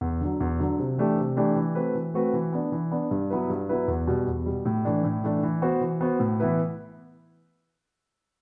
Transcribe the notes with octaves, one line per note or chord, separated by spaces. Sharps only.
E2
D3 F#3
E2
D3 F#3
C3
E3 A3 D4 G4
C3
E3 A3 D4 G4
E3
A3 C4 F#4 B4
E3
A3 C4 F#4 B4
E3
B3 D4
E3
B3 D4
G2
F#3 B3 E4 B4
G2
F#3 B3 E4 B4
E2
B2 G3
E2
B2 G3
A2
E3 A3 D4
A2
E3 A3 D4
E3
B3 F#4 C5
E3
B3 F#4 C5
A2
E3 B3 E4 B4